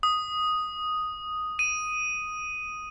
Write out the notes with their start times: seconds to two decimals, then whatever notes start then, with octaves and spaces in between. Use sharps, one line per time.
0.03 D#6
1.59 D#7